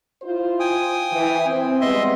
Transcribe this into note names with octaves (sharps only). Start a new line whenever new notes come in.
E4 F4 C5
G5 G#5 D#6
E3
C4
G3 G#3 B3 D#5 E5 C6